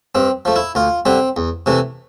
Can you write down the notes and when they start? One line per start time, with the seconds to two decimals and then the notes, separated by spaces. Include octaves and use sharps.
0.15 G2 C4
0.45 F3 A3
0.56 E4
0.75 D2 F4
1.06 D3 G3 C4
1.37 E2
1.66 C3 E3 A3